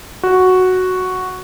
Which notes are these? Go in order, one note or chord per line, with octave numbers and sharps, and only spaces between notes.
F#4